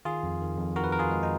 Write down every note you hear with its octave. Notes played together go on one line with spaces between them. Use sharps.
D#3 F4 G#4
F2
D#3
F2
D#3 F#4 A#4
B4
F2 A#4
F4 G#4
G#3
D#4